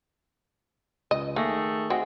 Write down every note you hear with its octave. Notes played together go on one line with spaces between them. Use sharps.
C#2 D#5
D#3 A3 A#3 G#4 A#6
C4 F#4 G#4 D#5